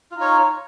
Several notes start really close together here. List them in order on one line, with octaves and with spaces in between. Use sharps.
F4 D#4 C#5